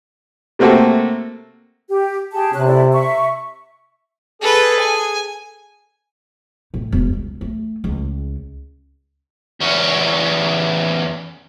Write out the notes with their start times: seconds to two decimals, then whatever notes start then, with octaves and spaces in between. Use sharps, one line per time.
0.59 C3 A3 A#3 C4 F#4 A4
1.89 G4
2.32 G4 G#4 A5
2.53 C3 C#4 F#6
2.67 E4 A4 D5
2.92 E5 C#6
4.42 G#4 A4 B4
4.80 G#5
6.74 A2
6.92 E1
7.13 C#2
7.41 A3
7.84 C#2
9.61 E2 C#4